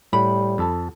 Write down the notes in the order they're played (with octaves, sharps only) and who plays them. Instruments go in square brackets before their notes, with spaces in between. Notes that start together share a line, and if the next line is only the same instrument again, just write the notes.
[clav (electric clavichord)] A2 [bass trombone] G3 [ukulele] B5
[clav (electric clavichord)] F2 A4 A5